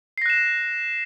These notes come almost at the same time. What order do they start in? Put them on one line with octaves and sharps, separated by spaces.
C7 A#6 F#6 E7